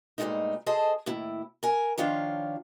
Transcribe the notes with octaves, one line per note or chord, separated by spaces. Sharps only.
G2 A#2 D3 G#3 A3 D#4
G#4 A4 C5 D#5 A5
D#2 A2 E4
A#4 G#5
D#3 F3 D4 F4 C#5